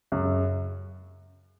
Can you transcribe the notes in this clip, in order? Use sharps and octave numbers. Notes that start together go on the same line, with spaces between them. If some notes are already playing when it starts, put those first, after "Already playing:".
F#2 C#3